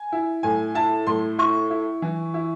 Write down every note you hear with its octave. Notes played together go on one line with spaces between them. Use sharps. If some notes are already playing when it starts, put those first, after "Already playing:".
Already playing: G#5
E4
A2 G#5
E4 A5
A2 C6
E4 C#6
E4
E3
E4